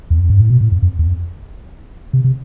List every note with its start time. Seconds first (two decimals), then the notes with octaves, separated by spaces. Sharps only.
0.10 E2
0.20 F2
0.30 G2
0.40 A2
0.50 B2
0.61 A2
0.72 F2
0.82 F2
0.99 E2
1.07 F2
2.13 C3
2.24 C3